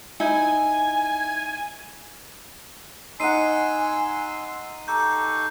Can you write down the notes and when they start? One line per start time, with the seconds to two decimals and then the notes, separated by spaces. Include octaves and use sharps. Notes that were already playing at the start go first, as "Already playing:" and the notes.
0.20 D#4 E4 G#5
3.20 D#4 D#5 F#5 G#5 C6 E6 C7 D#7
4.88 G4 A4 A#5 C#6 G6